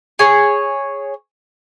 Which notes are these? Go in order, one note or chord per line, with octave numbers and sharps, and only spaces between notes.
G#4 C#5